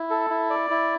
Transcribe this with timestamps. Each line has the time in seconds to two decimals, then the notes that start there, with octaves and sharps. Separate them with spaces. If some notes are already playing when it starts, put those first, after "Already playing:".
Already playing: E4
0.10 A4
0.30 E4
0.50 D5
0.70 E4